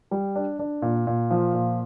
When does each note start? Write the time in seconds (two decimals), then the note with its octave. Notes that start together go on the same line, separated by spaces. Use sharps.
0.11 G3
0.35 D4
0.59 D4
0.82 A#2
1.07 A#2
1.31 F3
1.54 A#2